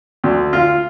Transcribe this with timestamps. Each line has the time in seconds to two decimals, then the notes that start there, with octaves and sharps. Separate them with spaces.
0.24 D2
0.53 F4